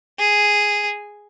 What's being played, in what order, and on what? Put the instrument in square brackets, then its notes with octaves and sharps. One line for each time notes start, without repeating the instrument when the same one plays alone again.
[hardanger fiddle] G#4